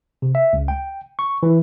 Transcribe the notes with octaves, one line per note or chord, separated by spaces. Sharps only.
C3
E5
C#2
G5
C#6
E3